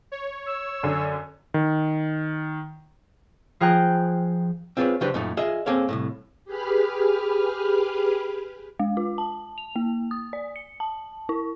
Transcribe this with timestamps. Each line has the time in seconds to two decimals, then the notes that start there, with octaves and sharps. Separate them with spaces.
0.12 C#5
0.46 E6
0.83 F#2 D3
1.54 D#3
3.60 F3 F4 G#4 G5 A#5 F#6
4.77 C4 F4 G#4 A4 B4 C#5
5.01 C#3 F#3 D4 G4 B4 C5
5.14 F#2 A#2 A3 D#4
5.37 F4 G#4 D#5 E5
5.66 A#3 C4 G#4 A4 C#5 F5
5.89 C2 F#2 A2
6.45 G4 G#4 B4 B5 F6
8.79 G#3
8.97 F4
9.18 A5
9.58 F7
9.76 A#3
10.11 D#6
10.33 D5
10.56 C#7
10.80 A5
11.29 E4